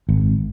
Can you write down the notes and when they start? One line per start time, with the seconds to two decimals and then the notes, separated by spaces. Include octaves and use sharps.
0.09 G#1